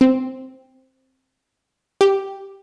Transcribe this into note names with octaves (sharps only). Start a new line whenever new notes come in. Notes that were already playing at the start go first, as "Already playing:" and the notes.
C4
G4